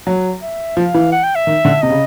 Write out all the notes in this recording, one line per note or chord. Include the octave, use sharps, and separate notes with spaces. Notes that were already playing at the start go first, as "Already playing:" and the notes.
F#3
E5
F3 F5
E3
F#5
G5
E5
D#3
D3
C3 D#5
C#3